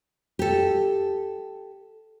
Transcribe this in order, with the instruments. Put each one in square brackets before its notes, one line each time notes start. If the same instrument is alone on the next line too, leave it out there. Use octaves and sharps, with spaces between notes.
[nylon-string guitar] G4 A4